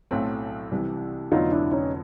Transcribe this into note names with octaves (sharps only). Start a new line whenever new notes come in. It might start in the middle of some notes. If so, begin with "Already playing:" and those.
B1 A2 F#3 A3 C4
C2 C3 E3
F1 F2 D3 F#3 B3 D#4 F4
D4 E4
C#4 D#4